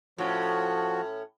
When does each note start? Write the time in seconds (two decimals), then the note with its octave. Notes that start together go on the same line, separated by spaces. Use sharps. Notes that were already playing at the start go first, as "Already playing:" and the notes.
0.18 A2 F3 C#4 F#4